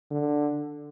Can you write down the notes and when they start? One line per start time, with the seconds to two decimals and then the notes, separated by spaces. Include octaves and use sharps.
0.11 D3